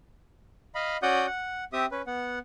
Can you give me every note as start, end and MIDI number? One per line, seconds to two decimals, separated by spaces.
0.75 0.97 75
0.75 0.97 77
0.75 0.97 83
1.02 1.26 61
1.02 1.26 66
1.02 1.26 74
1.02 1.26 78
1.02 1.26 87
1.02 1.26 91
1.27 1.64 78
1.73 1.86 60
1.73 1.86 67
1.73 1.86 76
1.73 1.86 87
1.91 2.02 61
1.91 2.02 71
2.07 2.39 59
2.07 2.39 78